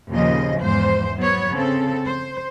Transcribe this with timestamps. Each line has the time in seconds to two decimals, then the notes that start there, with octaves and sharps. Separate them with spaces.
0.10 D#2 A#2 C#3 F3 D#5
0.60 E2 G#2 C5
1.18 F#3 B3 C#5
1.52 C#3 C4 A4
2.06 C5